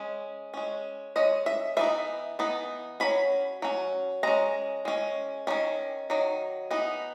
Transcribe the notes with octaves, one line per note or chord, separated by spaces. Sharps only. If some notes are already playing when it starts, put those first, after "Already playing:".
Already playing: G#3 C#4
G#3 C#4
G#3 C#4 D#5
E5
E3 B3 D#4 E5
E3 B3 D#4
F#3 C#4 B5
F#3 C#4
G#3 C#4 A#5
G#3 C#4
D#3 F#3 C#4
D#3 F#3
E3 B3 D#4